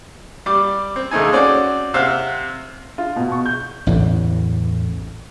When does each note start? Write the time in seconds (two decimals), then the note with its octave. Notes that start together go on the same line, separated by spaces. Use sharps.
0.46 G3 D6
0.96 C4
1.11 D#2 G#3 A3 D#4 G#5
1.33 C4 C#4 F#4 D5
1.94 C3 C4 F5 F#5
2.98 F4
3.16 B2
3.32 C#6
3.46 G6
3.87 A1 E2 A2 D3